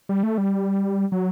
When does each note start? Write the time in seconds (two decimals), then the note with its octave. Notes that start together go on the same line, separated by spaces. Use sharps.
0.09 G3
0.23 A3
0.38 G3
1.12 F#3